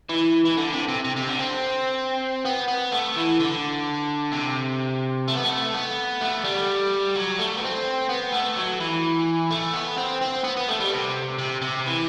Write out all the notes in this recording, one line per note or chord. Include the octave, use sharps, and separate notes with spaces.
E3
E3
D3
C3
C3
C3
C3
D3
C4
B3
B3
A3
E3
D3
C3
A3
B3
A3
B3
A3
G3
F#3
A3
B3
C4
B3
A3
F#3
E3
A3
B3
C4
C4
B3
B3
A3
G3
C3
C3
C3
E3